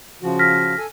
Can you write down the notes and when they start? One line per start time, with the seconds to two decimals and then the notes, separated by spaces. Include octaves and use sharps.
0.23 C#3 F3 F#4
0.39 F6 A#6 B6
0.78 A4 G#5